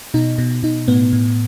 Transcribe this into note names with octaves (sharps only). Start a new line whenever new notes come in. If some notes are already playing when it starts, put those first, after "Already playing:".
B2 D#4
B2
B2 D#4
A2 B3
A2